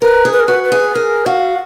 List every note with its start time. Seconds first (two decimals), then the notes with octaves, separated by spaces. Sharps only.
0.02 A#4 B4
0.25 G#4
0.33 B4
0.40 A#4
0.47 F#4 B4
0.64 B4
0.72 G#4
0.95 G#4 A#4
1.26 F#4 F5